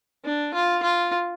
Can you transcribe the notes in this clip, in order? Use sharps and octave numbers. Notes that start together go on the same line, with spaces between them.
D4
F4
F4